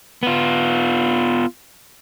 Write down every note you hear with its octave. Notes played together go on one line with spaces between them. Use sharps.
B3 F4